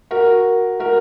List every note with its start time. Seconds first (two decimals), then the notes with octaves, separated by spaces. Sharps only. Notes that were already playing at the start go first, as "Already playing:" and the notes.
0.11 F#4 A#4
0.79 F#4 A#4